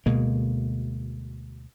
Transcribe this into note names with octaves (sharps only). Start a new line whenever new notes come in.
D2 B2 G#3 A#3